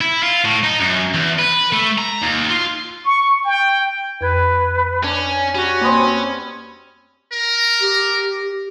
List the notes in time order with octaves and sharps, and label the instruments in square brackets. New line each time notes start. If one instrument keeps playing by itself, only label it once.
[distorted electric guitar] E4
F4
A2
D#4
F#2
E2
B4
A3
A#5
D#2
F4
[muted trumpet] C#6
G5
[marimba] F2 G#6 [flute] B4
[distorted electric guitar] C#4 [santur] D4
[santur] G3 [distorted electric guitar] C#4 [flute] F#4
[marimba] A#3 D#6 [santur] C4 B4 D5
[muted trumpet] A#4
[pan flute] G4